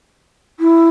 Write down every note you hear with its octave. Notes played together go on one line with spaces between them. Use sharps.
E4